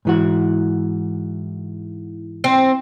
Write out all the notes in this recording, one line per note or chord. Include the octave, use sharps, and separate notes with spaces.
G#2 E3 F#4
C4